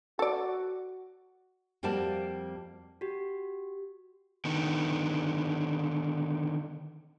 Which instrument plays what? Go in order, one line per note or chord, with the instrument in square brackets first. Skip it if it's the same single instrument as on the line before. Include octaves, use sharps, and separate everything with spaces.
[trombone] F#4 [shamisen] A4 D5
[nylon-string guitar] F2 G3 A#3 F#4 D5 A5
[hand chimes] F#4 G4
[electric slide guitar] D3 D#3 B3